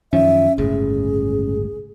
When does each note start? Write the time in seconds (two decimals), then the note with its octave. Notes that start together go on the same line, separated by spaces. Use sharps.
0.13 F#2 D#3 F3 C#4 E5
0.58 G1 C#2 A2 G#4